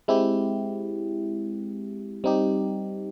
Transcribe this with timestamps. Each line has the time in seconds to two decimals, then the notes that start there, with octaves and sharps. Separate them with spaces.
0.08 G#3 C4 E4 G4
2.24 G3 C4 D#4 G4